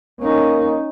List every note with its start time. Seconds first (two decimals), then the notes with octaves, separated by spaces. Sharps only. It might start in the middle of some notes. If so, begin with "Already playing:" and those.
0.21 A#3 C#4 D#4